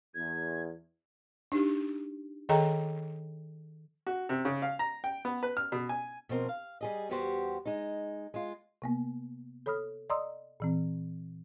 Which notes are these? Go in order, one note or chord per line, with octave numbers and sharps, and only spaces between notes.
E2 G#6
D4 D#4 G4
D#3 G#4 A4 D#5 G5 A#5
F#4
C3
C#3
F5
A#5
G5
B3
B4
F6
B2
G#5
B2 F3 C4 A#4
F5
G3 G#4 D#5
E2 G3 B3 F#4 G4 C5
G#3 D#4
G#3 F4
C3 A#3 B3
A4 C#5 B5 D#6 F6
D5 D#5 A#5 C6 D#6 E6
A#2 E3 C4